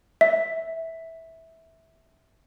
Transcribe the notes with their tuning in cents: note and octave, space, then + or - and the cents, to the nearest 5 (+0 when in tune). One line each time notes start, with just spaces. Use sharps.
E5 -15